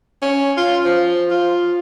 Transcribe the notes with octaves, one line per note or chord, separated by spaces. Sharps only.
C#4
F4
F3
F4